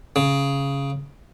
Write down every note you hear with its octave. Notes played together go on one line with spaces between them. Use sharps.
C#3